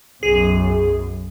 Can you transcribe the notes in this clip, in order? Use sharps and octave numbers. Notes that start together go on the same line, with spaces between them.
B1 F#2 G#4